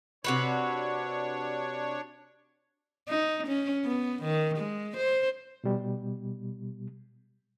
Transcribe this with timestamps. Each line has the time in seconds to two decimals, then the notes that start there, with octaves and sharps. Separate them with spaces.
0.24 C3 D4 F#4 B4 C#5
3.08 D#4
3.47 C#4
3.85 B3
4.23 D#3
4.58 G#3
4.97 C5
5.64 B2 G3